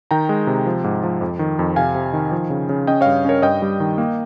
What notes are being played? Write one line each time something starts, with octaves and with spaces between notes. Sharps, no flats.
D#3 G5 A#5
G#3
C3
F3
G#2
F3
F2
D#3
F2
C3 F5 G#5
C3
D#3
F3
C#3
C#3
C#4 D#5 G5
G2 C#5 F5
C#4 A#4 C#5
G2 D#5 G5
G3
D#3
A#3